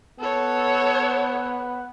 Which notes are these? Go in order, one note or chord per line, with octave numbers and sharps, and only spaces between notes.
B3 A4 B4 C#5 F#5